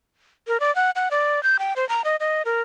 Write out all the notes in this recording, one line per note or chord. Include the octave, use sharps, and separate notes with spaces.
A#4
D5
F#5
F#5
D5
G6
G5
C5
A#5
D#5
D#5
A#4